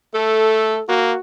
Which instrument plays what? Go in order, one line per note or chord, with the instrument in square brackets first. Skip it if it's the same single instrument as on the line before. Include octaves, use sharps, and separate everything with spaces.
[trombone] A3 [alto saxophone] A4
[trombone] A#3 [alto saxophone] F#4